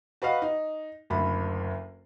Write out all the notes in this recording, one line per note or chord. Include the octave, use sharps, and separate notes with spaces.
F#4 B4 D#5 F5
D#4
F#1 D2 B5